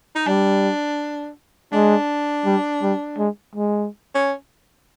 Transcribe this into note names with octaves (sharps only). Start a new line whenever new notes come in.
D#4
G3 D4
G#3 D4
G3
G3
G#3
G#3
C#4